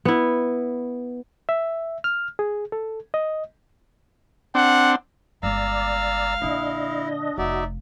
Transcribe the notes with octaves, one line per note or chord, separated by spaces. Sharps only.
B3 E4
E5
F6
G#4
A4
D#5
C4 D4 F#5
G1 G#3 D5 F5 A#5 E6
A#1 D3 D4 E4 D#5
F1 D#4 F#4 D5 E5